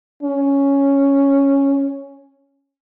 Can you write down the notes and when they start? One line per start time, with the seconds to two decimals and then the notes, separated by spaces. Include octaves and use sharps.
0.23 C#4